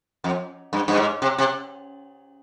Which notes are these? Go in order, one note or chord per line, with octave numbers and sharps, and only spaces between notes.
F2
G2
G2
G#2
C3
C3